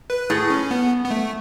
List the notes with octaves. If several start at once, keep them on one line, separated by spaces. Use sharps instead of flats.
B4
A2 G#4
C#4
B3
B3
A3